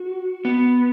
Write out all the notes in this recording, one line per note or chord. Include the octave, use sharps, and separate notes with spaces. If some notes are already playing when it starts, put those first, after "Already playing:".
Already playing: F#4
B3